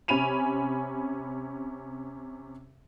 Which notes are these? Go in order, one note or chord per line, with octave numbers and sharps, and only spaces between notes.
C3 C#4 G#5 B5 D#7 F7